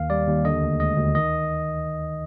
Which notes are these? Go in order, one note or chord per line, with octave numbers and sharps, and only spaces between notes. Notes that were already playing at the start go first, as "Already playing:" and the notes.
Already playing: D#2 D#3 F5
G3 D5
D#2
D3 D#5
D2
G#3 D#5
D2
D#3 D#5